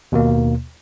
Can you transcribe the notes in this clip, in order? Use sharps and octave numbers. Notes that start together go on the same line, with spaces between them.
D#2 B2 A#3